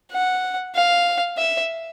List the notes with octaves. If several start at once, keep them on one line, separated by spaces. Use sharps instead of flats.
F#5
F5
E5